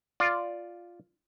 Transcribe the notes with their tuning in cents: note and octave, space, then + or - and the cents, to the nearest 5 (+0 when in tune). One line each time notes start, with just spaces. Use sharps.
F4 +0 D5 +0